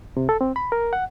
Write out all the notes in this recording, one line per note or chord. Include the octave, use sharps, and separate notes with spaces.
C3
A4
C4
B5
A#4
F#5